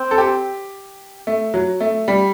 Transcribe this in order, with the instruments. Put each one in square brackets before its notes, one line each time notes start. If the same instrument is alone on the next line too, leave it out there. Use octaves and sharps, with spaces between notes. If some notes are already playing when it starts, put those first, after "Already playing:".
Already playing: [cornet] C4
[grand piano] A4
G4
A3
F#3
A3
G3